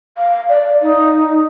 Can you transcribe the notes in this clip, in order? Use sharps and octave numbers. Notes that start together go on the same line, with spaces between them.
F5
D5
D#4